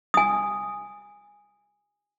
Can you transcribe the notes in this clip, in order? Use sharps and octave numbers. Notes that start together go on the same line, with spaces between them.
G#5 D#6